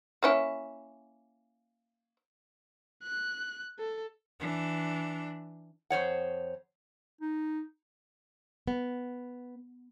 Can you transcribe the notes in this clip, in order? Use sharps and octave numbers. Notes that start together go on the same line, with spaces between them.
A#3 C#4 E4
F#6
A4
E3 D4
F2 C5 C#5 F#5
D#4
B3